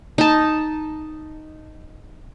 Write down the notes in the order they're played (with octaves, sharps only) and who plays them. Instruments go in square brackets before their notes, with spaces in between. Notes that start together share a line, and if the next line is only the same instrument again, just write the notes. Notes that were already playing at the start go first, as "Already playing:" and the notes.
[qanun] D#4 A5